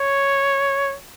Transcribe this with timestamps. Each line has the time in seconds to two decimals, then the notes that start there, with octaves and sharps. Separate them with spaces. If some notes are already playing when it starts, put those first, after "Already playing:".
Already playing: C#5